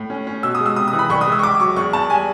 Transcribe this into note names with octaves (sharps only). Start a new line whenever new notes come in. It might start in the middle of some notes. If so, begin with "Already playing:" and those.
Already playing: A2
C#4
C#4
B2 E6
D#6
G#3
E6
C3 D#6
D#6
E3
B5
C2 C#6
D#6
G#3
E6
C#6
C#2 D6
F#3 C#6
E2 C#6
E2 A5
G3 G#5